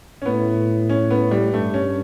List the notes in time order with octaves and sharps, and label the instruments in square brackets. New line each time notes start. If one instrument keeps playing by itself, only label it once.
[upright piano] C#4
[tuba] A2 [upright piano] B3
[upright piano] C#4
B3
G3
[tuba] G2 [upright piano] A3
[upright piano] C#4